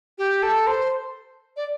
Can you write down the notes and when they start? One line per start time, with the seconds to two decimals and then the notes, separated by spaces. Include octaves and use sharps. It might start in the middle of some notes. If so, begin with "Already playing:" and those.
0.18 G4
0.43 A4
0.67 C5
1.57 D5